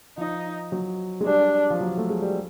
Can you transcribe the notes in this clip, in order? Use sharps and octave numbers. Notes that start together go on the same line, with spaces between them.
F3 D#4
F#3
G#3
G3 D4
F3
F#3
A3
G#3
G3